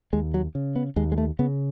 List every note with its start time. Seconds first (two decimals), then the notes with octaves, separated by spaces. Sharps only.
0.13 D#2 G#3
0.34 F#3
0.55 C#3
0.76 B3
0.96 D#2 G#3
1.12 G#3
1.18 A3
1.39 C#3 B3